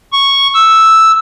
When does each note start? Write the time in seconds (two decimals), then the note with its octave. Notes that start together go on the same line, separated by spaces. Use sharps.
0.12 C#6
0.54 E6